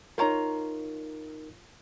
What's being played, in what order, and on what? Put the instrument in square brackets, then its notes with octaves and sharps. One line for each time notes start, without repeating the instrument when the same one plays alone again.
[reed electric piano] D#4 A#4 [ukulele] F4 C#5 A#5